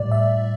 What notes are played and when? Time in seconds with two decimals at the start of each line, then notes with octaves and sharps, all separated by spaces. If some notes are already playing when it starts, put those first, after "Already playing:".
Already playing: A2 G3 D5
0.11 E5